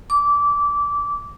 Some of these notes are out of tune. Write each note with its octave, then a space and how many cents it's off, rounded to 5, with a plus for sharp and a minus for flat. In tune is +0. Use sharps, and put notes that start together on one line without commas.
D6 -20